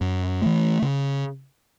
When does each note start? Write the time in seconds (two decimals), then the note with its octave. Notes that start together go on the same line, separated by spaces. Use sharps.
0.01 F#2
0.42 E3 A3
0.82 C#3